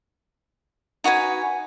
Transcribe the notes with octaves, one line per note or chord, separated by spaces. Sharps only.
D#4 F#4 B4 G#5